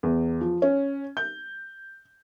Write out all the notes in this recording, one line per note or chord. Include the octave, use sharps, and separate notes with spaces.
E2
F3
C#4
G6